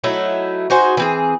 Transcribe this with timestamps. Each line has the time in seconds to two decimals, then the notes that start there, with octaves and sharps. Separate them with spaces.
0.04 F#3 A3 D#4 E4
0.70 D#4 F#4 G#4 C5
0.97 E3 C4 G#4